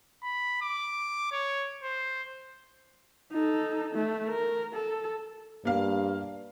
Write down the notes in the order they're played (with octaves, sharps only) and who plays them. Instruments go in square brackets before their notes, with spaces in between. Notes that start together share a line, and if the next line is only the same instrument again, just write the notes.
[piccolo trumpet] B5
D6
C#5
C5
[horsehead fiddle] D#4 A4
A3
A#4
A4
[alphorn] G2 [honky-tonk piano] A#3 F5